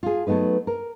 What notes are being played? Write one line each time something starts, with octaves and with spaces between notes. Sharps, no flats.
F4 G#4
F#3 A3 B3 D#4 B4
A#4